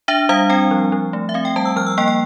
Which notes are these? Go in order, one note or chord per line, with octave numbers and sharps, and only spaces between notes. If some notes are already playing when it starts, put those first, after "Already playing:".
D4 E5
G3 F5
C4 G5
F3
F3
A3
E5
C4 F5
G5
G3 A5
E6
F3 F6
E6
A#3 G5
G5